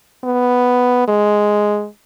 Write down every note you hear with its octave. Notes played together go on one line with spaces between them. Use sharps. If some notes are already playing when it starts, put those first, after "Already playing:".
B3
G#3